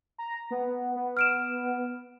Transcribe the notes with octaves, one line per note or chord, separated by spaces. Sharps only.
A#5
B3
B3
F6 D7 E7